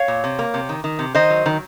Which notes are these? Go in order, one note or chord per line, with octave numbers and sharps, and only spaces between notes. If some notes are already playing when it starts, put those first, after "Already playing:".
Already playing: C#5 F5
A#2
C3
A#3
C3
D#3
D#3
C3
D#3 C5 D#5
F#3
D#3